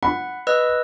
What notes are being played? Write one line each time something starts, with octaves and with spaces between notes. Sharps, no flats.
F#5 B5
B4 D#5 E6